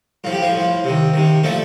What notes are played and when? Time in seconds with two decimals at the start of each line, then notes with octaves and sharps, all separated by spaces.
0.24 A2 F3 F4
0.32 G4
0.42 F3 F4
0.54 A2 F3
0.84 C3 D#3
1.14 C3 D#3
1.44 A#2 F3 A3 A4